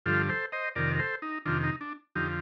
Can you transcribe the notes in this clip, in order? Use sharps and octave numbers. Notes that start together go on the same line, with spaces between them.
G2 D3 F3 F4 A4
A4 C5
C5 D#5
F2 C3 D#3 A#4 D5
A#4
A4 C5
D#4
F2 C3 D#3 D4 F4
D#4
D4
F2 D3 F3 D#4 G4